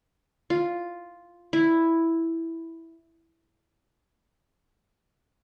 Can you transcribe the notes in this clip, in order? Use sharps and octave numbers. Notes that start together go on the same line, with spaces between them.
F4
E4